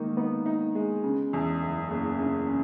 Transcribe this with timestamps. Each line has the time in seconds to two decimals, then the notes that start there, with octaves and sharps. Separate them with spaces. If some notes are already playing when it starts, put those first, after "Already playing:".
Already playing: D#3 G#3 A#3 D#4
0.17 B3 D#4
0.46 D#4
0.75 G#3
1.04 C#3
1.33 E2
1.62 F#1
1.90 F#1 A#3
2.19 C#3
2.48 C#3